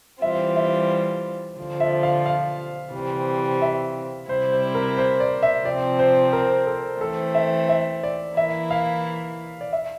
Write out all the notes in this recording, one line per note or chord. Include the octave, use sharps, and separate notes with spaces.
E3 G3 C4 F4 E5
E5
D3 F3 C4 F4
E5
F5
F5
C3 E3 G3 C4
E5
C3 G3 C4 E4 C5
C5
A#4
C5
D5
E5
C3 F3 C4 D5
C5
A#4
A4
E3 A3 C4 A4
E5
E5
D5
E3 A#3 E4 E5
F5
D5
E5